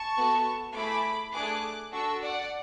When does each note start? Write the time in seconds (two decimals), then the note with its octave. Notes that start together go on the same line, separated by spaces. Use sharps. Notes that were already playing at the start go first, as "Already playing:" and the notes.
Already playing: A5 C#6
0.16 B3 F#4 A4
0.76 A3 E4 G#4 B5 D6
1.33 A3 D4 G#4 D6 F#6
1.92 D4 F#4 A4 C#6 E6
2.22 D5 F#5